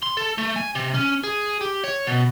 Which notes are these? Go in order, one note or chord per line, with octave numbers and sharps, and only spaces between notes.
C6
A4
A3
G#5
C3
C#4
G#4
G4
C#5
B2